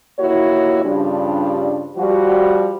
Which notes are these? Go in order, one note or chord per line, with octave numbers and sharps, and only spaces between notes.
D#2 A#3 E4 F#4 C#5
G2 C#3 F3 G3 D4
F3 G3 F#4